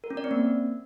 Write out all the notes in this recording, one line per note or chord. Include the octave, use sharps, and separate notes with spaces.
A#4
C#4
D5
C4
A#3